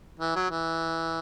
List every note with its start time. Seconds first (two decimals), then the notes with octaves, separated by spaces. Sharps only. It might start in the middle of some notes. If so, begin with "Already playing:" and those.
0.20 E3
0.36 F#3
0.51 E3